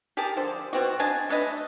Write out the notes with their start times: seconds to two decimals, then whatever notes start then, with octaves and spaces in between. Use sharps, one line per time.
0.17 G4 G#4 A#4 A5
0.37 D3 F3 D4 C5
0.73 B2 C4 F#4
0.99 D4 D#5 G#5 A5
1.29 A3 D4 B4 D#5